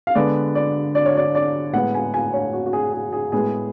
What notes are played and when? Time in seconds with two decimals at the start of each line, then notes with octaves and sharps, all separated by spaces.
0.07 F5
0.15 D3 G#3 B3 D5
0.55 D5
0.95 D5
1.06 C#5
1.17 D5
1.35 D5
1.74 A2 G#3 B3 F#5
1.94 G#5
2.14 G#5
2.33 C#5
2.53 F#4
2.66 F#4
2.73 G#4
2.93 G#4
3.13 G#4
3.32 A2 G#3 B3 G#4